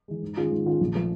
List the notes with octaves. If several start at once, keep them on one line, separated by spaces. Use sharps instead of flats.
E3 G#3
G#2
D#3 G#3 C#4 F4
G#2
D#3 G#3 C#4 F4
A#1
F3 A3